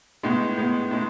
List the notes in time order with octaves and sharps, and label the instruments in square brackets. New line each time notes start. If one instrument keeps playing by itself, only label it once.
[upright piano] A2 G#3 B3
A2 G#3 B3
A2 G#3